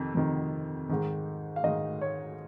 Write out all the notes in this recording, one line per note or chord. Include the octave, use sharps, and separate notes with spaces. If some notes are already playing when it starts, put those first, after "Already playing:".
Already playing: F2 C3 D#3
F2 C3 D#3
G#2 D#3
F5
G#2 D#3 D#5
C#5